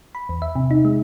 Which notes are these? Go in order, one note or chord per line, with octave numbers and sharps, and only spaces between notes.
B5
E2
E5
C3
D#4
G#3